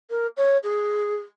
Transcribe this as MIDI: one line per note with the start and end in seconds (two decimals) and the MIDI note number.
0.10 0.27 70
0.36 0.57 73
0.63 1.16 68